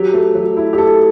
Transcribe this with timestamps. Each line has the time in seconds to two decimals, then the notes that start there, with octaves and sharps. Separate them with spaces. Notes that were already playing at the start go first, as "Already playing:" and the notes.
Already playing: F#3 G4
0.14 A3
0.35 F#3
0.57 E4
0.73 G4
0.78 A3 A4